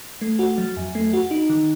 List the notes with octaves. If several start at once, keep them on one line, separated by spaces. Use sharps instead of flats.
A3
F#4
F#3
F2
A3
F#4
D#4
D#3